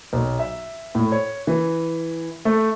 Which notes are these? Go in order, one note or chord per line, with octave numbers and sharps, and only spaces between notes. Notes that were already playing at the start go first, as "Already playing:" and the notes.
B1
E5
A2
C#5
E3
A3